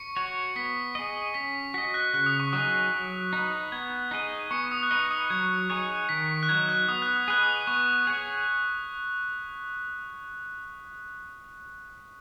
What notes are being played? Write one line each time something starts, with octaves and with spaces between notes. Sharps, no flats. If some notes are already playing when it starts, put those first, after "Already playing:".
Already playing: C#6 C#7
F#4 C#5
B3 B6
G#4 D#5
C#4 B6
F#4 D#5 B6
F#6
C#3 F#6
D#6
C#6
F#3 D#4 G#4 D#6
F#3
D#4 B4
B3 G#6
D#4 G#4 D#5
B3 C#6 C#7
D#6
F#6
D#4 B4 D#5 D#6
D#6
F#3 G#6
D#4 G#4 C#5
D#3 B6
F#6
F#3 D#4 G#6
F#6
B3 D#6
F#6
D#6
G#4 B4 D#5 F#6
D#6
B3 C#6
G#4 C#5